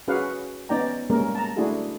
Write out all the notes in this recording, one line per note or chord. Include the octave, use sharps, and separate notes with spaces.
C#4 F#4 G#4 B4 F5 F#5
B3 C#4 D#4 D5 G5 A#5
G3 G#3 A#3 C#4 A#4
A5 A#5
A3 D4 E4 F#4 G#4